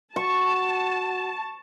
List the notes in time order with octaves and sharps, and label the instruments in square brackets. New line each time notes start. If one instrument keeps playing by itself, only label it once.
[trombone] F#4 [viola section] A5 [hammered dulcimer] C#6